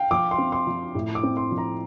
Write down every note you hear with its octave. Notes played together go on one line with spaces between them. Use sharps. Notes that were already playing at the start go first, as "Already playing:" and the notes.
Already playing: F5 G5
F3 D6
C6
C4
C6
F3
A2
D6
C4
C6
F3
A#5